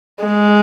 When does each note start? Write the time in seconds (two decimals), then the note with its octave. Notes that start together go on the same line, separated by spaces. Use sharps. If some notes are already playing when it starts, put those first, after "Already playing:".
0.24 G#3